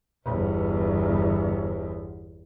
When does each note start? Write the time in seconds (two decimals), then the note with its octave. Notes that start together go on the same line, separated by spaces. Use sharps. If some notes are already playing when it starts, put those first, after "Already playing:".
0.24 G1 E2